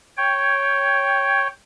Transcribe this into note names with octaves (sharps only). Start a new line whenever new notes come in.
C#5 G5